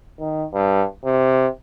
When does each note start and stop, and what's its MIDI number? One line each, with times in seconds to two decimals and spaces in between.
0.20 0.45 51
0.53 0.85 43
1.04 1.47 48